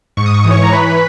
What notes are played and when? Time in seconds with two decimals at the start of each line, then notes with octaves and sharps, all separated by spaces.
0.17 G#2 C#6
0.26 D#6
0.34 C#6
0.43 E3 D#6
0.51 C#5 C#6
0.63 A#5
0.72 E3 B4 B5